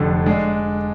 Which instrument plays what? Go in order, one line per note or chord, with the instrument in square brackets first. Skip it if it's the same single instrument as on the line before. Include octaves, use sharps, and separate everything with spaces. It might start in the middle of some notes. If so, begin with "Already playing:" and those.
Already playing: [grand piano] F1 F2 D3
G#3 D4